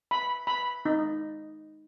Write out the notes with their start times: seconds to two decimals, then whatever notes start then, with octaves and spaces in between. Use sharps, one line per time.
0.11 B5
0.47 B5
0.85 D#4